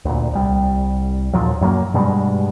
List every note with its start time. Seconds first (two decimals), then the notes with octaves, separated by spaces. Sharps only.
0.05 D2 A#2
0.33 C2 G3
1.33 D#2 A#2 F3 F#3
1.61 F#2 F#3 G3 A#3
1.94 G2 B2 G3 G#3